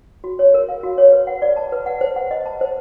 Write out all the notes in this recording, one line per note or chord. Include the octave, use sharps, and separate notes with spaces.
F#4
C#5
A#4
F5
F#4
C#5
B4
F#5
D5
A5
B4
F#5
C5
F#5
D#5
A5
C5